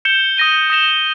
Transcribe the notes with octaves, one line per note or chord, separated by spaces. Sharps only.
G6 C#7 E7 G7
D#6 A#6 D#7 G7
D#6 A#6 E7 G7